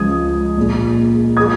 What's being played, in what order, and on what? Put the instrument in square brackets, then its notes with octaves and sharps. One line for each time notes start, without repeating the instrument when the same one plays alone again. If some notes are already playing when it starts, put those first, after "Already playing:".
Already playing: [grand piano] C#2 C#3 F3 G#3 D#6 G#6
A#1 A#2 G#3
F3 G#3 D#6 G#6